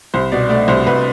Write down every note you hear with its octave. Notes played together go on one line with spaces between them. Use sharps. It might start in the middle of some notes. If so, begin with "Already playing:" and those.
C2 C5
B2 D5
A3 D5
C2 C5
C2 B4